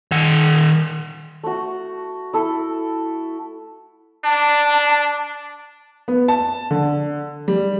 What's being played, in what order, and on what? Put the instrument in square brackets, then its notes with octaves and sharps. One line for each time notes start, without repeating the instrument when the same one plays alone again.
[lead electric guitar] D#3 F#5
[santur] A3 F#4
E4 A4
[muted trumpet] D4 [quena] A5
[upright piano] B3
A5
D3
G3